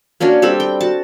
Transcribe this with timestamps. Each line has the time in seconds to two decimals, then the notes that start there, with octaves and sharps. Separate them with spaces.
0.20 A#3 C#4 D4 F#4
0.42 G3 C4 A4 B5
0.60 G5
0.81 F#4 A5